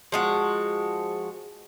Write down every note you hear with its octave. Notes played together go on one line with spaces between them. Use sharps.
F3 G#3 F#4